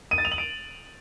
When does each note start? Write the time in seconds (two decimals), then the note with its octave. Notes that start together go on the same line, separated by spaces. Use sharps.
0.11 D#7
0.18 A6
0.25 F7
0.31 F#7
0.38 D7